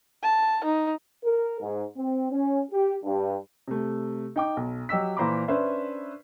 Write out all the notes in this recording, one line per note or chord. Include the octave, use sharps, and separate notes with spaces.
A5
D#4
A#4
G#2
C4
C#4
G4
G2
C3 A3
D#4 G5 D6
B1
F#3 G4 D#5 E6 B6
A#2 E3 C5 A#5 B5 D6
C#4 D4 B4 C5 E5